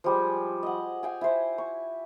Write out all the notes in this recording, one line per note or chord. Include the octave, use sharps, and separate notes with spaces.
F3 G3 G#3
D#5 F#5
F5 G5 G#5
E4 C5
C#6